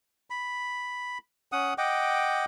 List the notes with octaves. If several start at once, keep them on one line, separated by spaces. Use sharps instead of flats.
B5
C#4 F#5 D#6
D#5 F#5 G5 D6